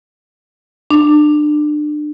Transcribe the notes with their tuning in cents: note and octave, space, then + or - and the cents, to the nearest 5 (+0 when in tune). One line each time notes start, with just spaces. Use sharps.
D4 +30